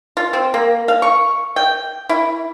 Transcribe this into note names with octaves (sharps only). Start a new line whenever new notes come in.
F4
C4
A#3
F5
C#6
G5
E4